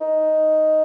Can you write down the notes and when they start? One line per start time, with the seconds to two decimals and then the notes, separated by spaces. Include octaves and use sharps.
0.01 D#4